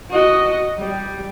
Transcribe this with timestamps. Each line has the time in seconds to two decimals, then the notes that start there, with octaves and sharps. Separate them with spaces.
0.11 F#4 D#5
0.79 G3